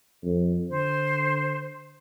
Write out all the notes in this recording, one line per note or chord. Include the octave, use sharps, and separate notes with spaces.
F2
D3 C5